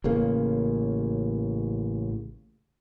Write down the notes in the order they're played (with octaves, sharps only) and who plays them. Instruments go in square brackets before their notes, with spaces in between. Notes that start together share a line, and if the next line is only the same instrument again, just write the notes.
[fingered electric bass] A1 C#3 A#3